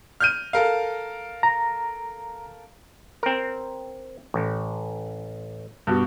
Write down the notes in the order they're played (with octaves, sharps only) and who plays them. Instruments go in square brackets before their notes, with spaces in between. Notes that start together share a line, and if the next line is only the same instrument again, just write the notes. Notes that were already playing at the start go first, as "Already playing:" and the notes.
[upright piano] F6 G6 D#7
A4 A#4 F5
[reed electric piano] A#5
[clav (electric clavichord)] C4 A#4
A1
[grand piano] G2 B2 F#4